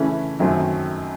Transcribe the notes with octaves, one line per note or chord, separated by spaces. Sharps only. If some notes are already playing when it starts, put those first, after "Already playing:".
Already playing: C#3 E3 A3 C#4
F#2 D#3 F#3 A3 C4